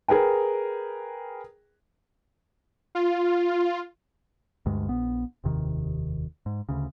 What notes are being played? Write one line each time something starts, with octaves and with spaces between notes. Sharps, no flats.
G#4 A#4 B4 G5
F4
D2 G2 G#3
A#1 B3
F1 D#2 C3 D#3
G#2
D2 C#3